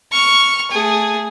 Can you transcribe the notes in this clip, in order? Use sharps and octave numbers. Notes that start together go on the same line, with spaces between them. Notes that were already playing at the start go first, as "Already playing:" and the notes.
C#6 F6
A3 G#4